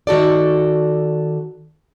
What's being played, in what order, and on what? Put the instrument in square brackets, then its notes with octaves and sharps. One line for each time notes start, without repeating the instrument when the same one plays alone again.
[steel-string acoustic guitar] D#3 F#4 A4 D5